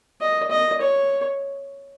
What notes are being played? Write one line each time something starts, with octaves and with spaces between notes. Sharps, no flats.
D#5
D#5
C#5